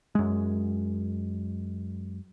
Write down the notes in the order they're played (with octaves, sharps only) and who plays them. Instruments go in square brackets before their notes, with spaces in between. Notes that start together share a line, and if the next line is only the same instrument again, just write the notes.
[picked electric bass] F#2 G#3